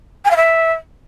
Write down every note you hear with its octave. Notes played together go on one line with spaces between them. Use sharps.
G#5
F5
E5